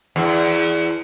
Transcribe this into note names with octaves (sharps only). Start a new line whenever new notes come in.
E2